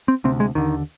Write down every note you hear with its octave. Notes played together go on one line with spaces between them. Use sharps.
C4
D2 C3 C4
G#3
D#2 D3 D#3